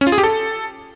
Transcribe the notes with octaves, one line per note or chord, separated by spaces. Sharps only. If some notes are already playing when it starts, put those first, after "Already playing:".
C#4
F4
G#4
G4
A4